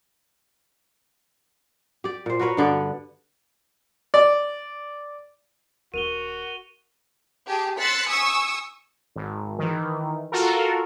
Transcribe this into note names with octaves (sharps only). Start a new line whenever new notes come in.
G4 D5
A#2 C5
F#4 A#4 B4 C#5
G2 D3 B3 D5
D5
D#1 D4 F#4 A#4 D#7 F7 G7
G4 G#4 G#5 A5
C6 E6 F#6 A6 B6 C#7
G#5 C#6 D#6 E6
G#1
D#3 E3
F4 F#4 A4 A#4